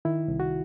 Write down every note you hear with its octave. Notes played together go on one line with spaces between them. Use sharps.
D#3 E4
C2
F#4